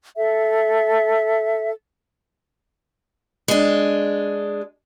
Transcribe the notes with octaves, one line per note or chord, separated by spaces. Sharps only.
A4 E5
G#3 D4